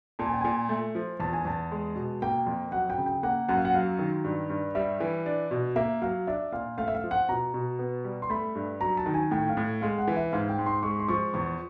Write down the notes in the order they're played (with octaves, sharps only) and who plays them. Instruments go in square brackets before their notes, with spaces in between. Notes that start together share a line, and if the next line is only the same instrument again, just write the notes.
[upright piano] A#2 [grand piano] A5
[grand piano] G#5
G5
[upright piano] A#2 [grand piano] G#5
[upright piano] A3
F3
[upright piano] E2 [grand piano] A5
[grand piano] G#5
[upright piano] E2 [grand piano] A5
[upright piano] G#3
B2
[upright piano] A#3 [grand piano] G5
[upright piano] F2
[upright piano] F#3 [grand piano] F#5
[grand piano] G5
[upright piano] C#3
[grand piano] G5
[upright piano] A#3 [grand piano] F#5
[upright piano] F#2 [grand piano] F#5
[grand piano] F5
F#5
[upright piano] F#3 [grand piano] F5
[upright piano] D#3
G2
G2
[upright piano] G3 [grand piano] E5
[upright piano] E3
D4
B2
[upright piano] A#3 [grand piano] E5
[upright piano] F#3 [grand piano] F5
[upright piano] D4 [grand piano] E5
[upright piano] A#2 [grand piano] F5
[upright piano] A3 [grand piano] F5
[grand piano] E5
F5
[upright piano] F3
[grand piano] F#5
[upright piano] B2 [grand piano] A#5
[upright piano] B2
B3
G3
[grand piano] C6
[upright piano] A3 [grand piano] B5
[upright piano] G2
[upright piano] F#3 [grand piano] A#5
[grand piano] A5
[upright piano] D#3
[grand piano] G#5
[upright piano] A2 [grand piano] G5
[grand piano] F5
[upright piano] A2
[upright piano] G#3 [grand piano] F5
[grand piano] F#5
[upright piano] E3
[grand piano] E5
[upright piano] G#2 [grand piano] F5
[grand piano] G5
[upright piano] G#2
[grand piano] C6
[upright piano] G#3 [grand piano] C#6
[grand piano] C6
[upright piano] F3 [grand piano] C#6
[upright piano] E2 [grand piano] C#6